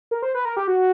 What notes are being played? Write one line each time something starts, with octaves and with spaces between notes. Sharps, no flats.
A#4
C5
B4
A#4
G4
F#4